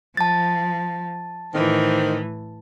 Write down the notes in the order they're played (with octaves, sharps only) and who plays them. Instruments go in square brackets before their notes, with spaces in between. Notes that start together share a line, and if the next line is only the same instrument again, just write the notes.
[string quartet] F3 [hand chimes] A5 A6
[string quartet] A2 E3 [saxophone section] D#3 C5